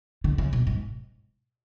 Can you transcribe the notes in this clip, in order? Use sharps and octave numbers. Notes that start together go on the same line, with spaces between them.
D3
C#3
B2
G#2